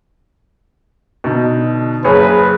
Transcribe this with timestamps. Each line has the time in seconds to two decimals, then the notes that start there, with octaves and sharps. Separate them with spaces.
1.24 B2 D3 D#4
2.04 F#1 G#4 B4 C#5